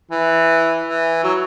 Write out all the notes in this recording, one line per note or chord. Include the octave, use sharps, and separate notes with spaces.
E3
E3
F#3